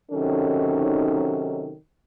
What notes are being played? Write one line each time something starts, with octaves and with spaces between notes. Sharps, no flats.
C3 D#3 F#3 C#4 D#4 A4